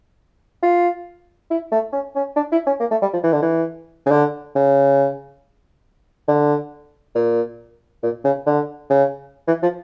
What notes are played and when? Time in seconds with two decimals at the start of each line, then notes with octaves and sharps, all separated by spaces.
0.63 F4
1.51 E4
1.72 A3
1.93 C#4
2.16 C#4
2.36 D4
2.52 E4
2.67 C#4
2.80 A#3
2.91 A3
3.02 G3
3.13 F3
3.24 E3
3.33 D3
3.42 E3
4.06 C#3
4.11 D3
4.55 C#3
6.28 D3
7.15 A#2
8.03 A#2
8.25 C#3
8.46 D3
8.90 C#3
9.48 E3
9.63 F3